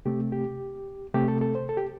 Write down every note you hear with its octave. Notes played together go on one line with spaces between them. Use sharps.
C3 A3 C4 G4
G4
C3 A3 C4 G4
A4
A4
C5
A4
G4